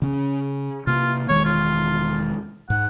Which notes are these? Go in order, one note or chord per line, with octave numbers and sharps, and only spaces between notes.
C#3 C#4
C3 A#3 F4
E1 D#3 G#3 C#5
F4
G#2 F#5